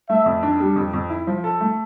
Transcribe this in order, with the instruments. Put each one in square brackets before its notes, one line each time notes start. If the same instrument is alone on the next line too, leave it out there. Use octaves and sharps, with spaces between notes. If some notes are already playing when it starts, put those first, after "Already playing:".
[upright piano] A3 [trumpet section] E5
[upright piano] F2
D4
G3
F2
F2
E4
F3
A4
A3